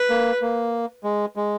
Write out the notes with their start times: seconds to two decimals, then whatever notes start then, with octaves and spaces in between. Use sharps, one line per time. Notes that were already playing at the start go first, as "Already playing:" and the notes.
Already playing: B4
0.10 A#3
0.42 A#3
1.04 G#3
1.36 G#3